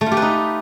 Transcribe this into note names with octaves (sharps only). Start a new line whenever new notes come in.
A3
F4
G4
B4
D#4